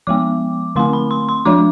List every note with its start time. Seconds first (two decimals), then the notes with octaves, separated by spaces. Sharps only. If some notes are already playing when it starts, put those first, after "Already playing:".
0.07 F3 G#3 B3 D6
0.76 D3 A3 C4 C6
0.93 B5
1.11 C6
1.29 C6
1.45 F3 G#3 D4 D6